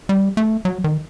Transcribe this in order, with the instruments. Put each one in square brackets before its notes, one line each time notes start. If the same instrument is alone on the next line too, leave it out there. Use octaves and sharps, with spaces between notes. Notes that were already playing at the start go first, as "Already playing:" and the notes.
[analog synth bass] G3
A3
F#3
D#3